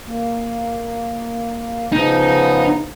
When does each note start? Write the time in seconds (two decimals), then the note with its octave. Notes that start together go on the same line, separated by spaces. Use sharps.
0.06 A#3
1.92 C#3 F3 B3 D#4